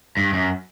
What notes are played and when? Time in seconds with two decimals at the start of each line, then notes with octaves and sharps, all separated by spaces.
0.17 G2
0.33 F#2